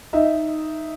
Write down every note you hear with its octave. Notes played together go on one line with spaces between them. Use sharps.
D#4 D#5 E5